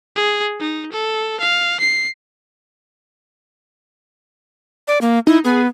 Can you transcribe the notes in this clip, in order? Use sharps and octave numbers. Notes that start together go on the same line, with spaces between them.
G#4
D#4
A4
F5
C7
D5
A#3
D#4 E4
B3 G#4